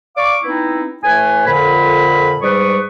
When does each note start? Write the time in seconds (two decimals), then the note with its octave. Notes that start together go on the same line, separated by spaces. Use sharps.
0.16 D5 F5 C#6 D6
0.44 B3 C4 D#4 E4
1.03 A2 A3 B4 G#5
1.46 F2 A#2 D3 A#4 B5
2.42 G#2 G3 B4 D5 C#6 D#6